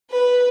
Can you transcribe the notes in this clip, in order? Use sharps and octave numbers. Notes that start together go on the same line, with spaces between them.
B4